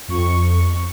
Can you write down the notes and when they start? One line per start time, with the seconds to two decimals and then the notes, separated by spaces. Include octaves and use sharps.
0.08 F2 C#6